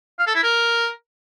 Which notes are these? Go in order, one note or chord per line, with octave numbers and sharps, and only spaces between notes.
F5
A4
E4
A#4